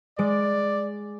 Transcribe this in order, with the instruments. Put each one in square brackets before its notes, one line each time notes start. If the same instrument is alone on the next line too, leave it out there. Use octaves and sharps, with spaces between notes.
[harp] G#3 D7 [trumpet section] D5